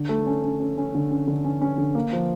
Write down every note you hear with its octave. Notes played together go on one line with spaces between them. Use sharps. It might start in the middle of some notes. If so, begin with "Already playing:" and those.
Already playing: D3
A3
C#4
C#4
C#4
C#4
D3
C#4
D3
C#4
C#4
D3
A#3
F3